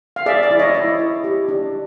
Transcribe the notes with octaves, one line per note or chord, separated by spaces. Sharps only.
F5
G#4 D5 E5
D5
E4
C#5 D#5
E4
C#5
G4
D4